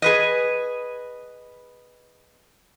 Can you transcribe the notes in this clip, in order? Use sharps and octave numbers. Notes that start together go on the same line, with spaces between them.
G#4 B4 D#5